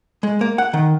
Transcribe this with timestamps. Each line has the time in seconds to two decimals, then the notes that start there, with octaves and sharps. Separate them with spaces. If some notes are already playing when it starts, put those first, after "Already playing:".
0.23 G#3
0.41 A#3
0.58 F#5
0.73 D#3